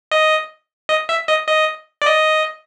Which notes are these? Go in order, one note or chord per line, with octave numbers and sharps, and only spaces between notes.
D#5
D#5
E5
D#5
D#5
D5
D#5